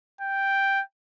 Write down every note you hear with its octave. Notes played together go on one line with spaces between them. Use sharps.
G5